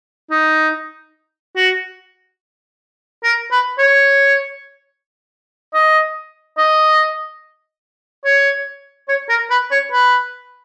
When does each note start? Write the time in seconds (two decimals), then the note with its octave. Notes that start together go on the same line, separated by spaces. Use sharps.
0.31 D#4
1.56 F#4
3.23 A#4
3.51 B4
3.79 C#5
5.74 D#5
6.58 D#5
8.25 C#5
9.08 C#5
9.29 A#4
9.50 B4
9.71 C#5
9.92 B4